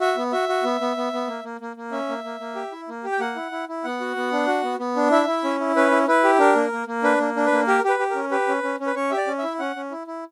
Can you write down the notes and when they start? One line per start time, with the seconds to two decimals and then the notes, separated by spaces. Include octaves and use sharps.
0.01 F#4 E5
0.17 B3
0.32 F#4 E5
0.49 F#4
0.64 B3
0.81 B3
0.97 B3
1.13 B3
1.28 A#3
1.44 A#3
1.61 A#3
1.77 A#3
1.92 C#4 E5
2.09 A#3
2.24 A#3
2.40 A#3
2.55 G4
2.72 E4
2.89 A#3
3.04 G4
3.12 G5
3.20 A#3 F#5
3.36 E4
3.52 E4
3.69 E4
3.84 B3 F#5
4.01 F#4
4.16 B3
4.32 D4
4.47 F#4
4.63 B3
4.79 B3
4.96 D4
5.11 E4 E5
5.27 E4
5.44 C#4
5.60 E4
5.76 C#4 B4
5.91 E4
6.08 E4 B4
6.24 G4
6.39 D4 A#4
6.55 A#3
6.72 A#3
6.87 A#3
7.03 D4 B4
7.19 A#3
7.36 D4
7.46 B4
7.52 A#3
7.67 G4 A#4
7.84 G4 B4
7.99 G4
8.10 C#4 A#4
8.31 G4 B4
8.48 C#4
8.63 C#4
8.80 C#4
8.87 B4
8.96 C#4 C#5
9.10 G4 E5
9.17 D5
9.27 C#4
9.38 E4 E5
9.59 C#4 F#5
9.76 C#4
9.91 E4
10.07 E4